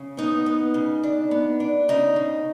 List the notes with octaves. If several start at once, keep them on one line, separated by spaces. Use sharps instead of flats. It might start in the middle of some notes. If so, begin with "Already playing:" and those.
Already playing: C#3
B3 D#4
B3
C#3
D4
B3
D4
C#3 D#4
C#3